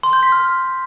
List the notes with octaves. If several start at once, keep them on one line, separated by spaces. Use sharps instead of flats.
C6
G6
B6
F6